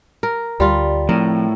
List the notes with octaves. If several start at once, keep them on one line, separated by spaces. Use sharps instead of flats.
A#4
D2 G3 F4
A2 F3 C4 A#4